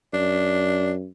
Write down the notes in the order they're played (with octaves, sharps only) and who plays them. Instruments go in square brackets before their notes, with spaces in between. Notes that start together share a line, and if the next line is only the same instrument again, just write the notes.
[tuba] F#2 [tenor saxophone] D4